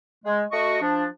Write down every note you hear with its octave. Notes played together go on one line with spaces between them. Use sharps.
G#3
A3 F#4 D#5 C#6
F3 D4